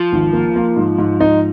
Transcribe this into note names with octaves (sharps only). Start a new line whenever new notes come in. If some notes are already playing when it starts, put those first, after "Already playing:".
Already playing: F3
G#1
A#3
A#3
G#2
G#2
D#4